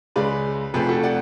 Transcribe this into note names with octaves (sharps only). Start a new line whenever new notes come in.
C#2 C#3 G#3 B4 D5
F1 F2 F3 A3 G#4 B4
F#4 A4
D5 F#5